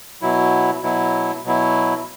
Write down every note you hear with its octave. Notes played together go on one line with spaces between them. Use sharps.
B2 F#3 E4
B2 F#3 E4
B2 F#3 E4